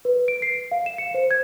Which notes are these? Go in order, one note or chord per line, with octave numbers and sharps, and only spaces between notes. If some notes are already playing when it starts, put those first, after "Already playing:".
B4
D7
C7
F5
E7
C#7
C5
G#6